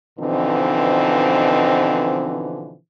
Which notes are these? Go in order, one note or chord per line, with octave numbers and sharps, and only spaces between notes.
B2 D3 E3 F3 C4 D#4